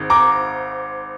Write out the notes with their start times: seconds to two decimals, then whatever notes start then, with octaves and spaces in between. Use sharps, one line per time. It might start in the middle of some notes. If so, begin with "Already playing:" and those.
Already playing: G#1 G#2 D#3
0.10 A#5 D6